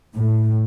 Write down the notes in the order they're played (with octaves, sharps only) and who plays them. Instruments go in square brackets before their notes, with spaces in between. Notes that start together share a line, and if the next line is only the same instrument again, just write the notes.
[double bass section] A2